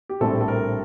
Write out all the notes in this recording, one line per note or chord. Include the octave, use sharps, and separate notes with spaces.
G4
A#1 A2 G3 C4 A4
A4
A#4